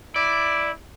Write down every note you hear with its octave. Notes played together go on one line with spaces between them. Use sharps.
E4 D5